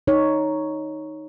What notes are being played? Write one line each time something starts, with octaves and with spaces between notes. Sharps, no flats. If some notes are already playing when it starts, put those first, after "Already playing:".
D#4 C#5